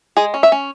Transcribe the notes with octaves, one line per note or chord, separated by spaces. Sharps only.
G#3 G#4
C#4
E5
C#4